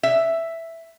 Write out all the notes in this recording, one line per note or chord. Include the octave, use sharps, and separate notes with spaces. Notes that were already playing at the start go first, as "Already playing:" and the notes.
E5